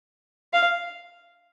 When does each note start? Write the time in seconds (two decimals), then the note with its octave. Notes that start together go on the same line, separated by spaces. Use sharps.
0.53 F5